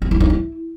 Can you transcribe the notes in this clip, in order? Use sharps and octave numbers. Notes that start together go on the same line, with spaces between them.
C4
E4
D#4
E4